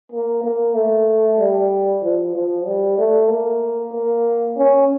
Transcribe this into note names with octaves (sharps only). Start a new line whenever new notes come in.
A#3
A#3
A3
G3
F3
F3
G3
A3
A#3
A#3
C#4